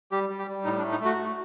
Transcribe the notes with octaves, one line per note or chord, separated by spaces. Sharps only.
G3 G4
G3
G4
G3
A2 D#4
D4
A3
D#4
A3 F#4
A3